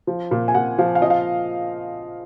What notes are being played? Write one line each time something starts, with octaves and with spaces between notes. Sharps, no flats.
F3
A#2
G#5
A#2 F#5
F3 F5
F5
F3 D#5
F5